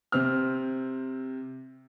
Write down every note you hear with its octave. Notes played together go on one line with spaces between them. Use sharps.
C3 C4 F6